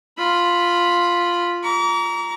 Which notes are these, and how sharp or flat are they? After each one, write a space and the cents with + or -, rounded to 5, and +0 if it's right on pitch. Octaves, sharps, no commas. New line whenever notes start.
F4 +0 B5 +0
A#5 +5 D6 -45